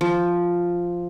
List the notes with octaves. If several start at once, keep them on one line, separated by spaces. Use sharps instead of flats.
F3